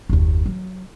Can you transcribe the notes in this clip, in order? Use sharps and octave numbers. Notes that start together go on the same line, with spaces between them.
F#1 D#2
F#3